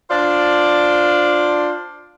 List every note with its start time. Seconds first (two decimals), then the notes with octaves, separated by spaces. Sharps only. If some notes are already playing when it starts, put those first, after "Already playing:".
0.10 D4 F4 C5 D5